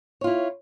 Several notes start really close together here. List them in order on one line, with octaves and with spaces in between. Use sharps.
C#5 F4 E4